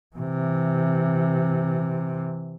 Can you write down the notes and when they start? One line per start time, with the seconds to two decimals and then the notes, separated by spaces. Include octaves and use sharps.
0.16 C3 E3